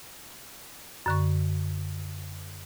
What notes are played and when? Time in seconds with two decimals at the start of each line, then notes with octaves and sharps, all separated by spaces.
1.06 F#2 D3 C#6